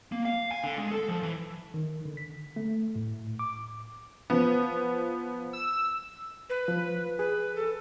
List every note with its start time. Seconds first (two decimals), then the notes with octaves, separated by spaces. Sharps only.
0.12 A#3
0.25 F5
0.52 G#5
0.64 D3
0.78 G#3
0.92 A4
1.08 F3
1.23 E3
1.74 D#3
2.05 D3
2.17 B6
2.56 A3
2.96 A2
3.39 D6
4.30 F3 B3
5.53 E6
6.50 B4
6.68 F3
7.19 G#4 B4
7.55 A4